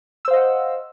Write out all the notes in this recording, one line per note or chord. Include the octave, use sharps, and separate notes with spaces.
C5 D#5 F5 F#5 E6